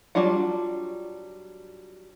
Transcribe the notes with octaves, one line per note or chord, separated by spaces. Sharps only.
F#3 G3 D4 F4 F#5